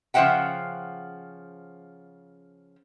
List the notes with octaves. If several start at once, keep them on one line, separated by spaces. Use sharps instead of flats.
C#3 F3 C5 E5 F#5 G5